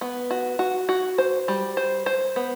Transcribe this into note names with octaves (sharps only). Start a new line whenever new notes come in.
B3
F#4
F#4
F#4
C5
G3
C5
C5
B3